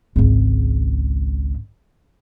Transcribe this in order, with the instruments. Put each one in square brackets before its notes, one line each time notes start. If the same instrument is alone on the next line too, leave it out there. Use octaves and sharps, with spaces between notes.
[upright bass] G#1 C#2